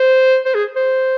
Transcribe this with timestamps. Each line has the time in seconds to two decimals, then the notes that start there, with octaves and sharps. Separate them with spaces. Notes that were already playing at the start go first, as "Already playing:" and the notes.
Already playing: C5
0.45 C5
0.55 G#4
0.76 C5